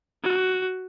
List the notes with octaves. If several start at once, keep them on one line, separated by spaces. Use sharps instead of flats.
F#4